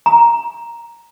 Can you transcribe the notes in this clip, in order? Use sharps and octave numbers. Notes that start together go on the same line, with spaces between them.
A#5